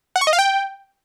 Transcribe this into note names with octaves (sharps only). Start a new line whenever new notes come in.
F#5
C#6
D#5
F5
G5